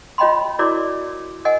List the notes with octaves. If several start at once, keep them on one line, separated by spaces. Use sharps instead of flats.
F4 C#5 D#5 G5 B5 C6
E4 F#4 A#4 C#5 D5 D6
A#4 D#5 F#5 G#5